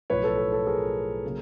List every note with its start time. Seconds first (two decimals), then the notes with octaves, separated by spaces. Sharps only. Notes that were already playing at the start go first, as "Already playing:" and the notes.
0.10 B1 A2 F3 B4 C#5
0.24 A4 B4
0.38 A4
0.52 A4
0.67 G#4 A#4
1.25 C#3 F#3 A#3